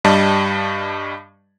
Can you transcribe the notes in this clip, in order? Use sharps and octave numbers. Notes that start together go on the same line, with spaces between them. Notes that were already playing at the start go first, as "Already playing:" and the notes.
G2 G3 D#5 A5